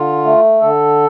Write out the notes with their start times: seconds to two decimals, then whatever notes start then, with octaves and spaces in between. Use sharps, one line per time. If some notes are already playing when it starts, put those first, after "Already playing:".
Already playing: D3 F4
0.25 A3
0.61 D3 A4